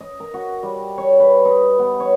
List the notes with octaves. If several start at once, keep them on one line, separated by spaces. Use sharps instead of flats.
D#5
A#4
F#4
G3
C#5
B4
D#4
B3
C#5